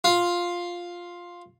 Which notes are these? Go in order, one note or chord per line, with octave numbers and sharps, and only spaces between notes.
F4